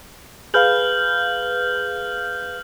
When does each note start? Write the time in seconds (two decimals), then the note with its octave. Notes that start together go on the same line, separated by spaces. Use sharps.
0.54 G#4 B4 F5 F6 G6 F#7